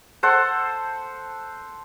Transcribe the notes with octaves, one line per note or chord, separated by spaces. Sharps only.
A4 C5 F#5